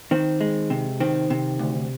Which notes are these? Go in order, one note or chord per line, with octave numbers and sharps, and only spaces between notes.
D#3 C4
G#3
C3
D#3 C4
C3
D2